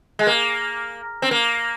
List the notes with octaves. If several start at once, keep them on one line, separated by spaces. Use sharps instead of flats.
G#3
A#3
C4
A#3